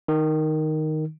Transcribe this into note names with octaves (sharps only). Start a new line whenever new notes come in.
D#3